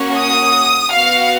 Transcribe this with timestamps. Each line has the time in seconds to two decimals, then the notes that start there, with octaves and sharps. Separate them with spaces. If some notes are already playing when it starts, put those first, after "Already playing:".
Already playing: A#3 C#4 F#4
0.17 D#6
0.90 B3 F#4 F5